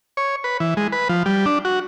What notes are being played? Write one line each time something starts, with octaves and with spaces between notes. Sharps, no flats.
C#5
B4
E3
G#3
B4
F3
G3
D4
F#4